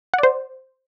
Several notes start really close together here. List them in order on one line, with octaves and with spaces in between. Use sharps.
F#5 D5 C5